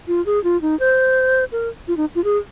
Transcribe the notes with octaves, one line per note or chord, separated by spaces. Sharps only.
F4
G#4
F4
D#4
C5
A#4
F4
D#4
F4
G#4